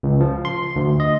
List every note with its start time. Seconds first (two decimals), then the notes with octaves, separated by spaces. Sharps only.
0.03 C#2
0.20 F3
0.45 C6
0.76 D2
1.00 D#5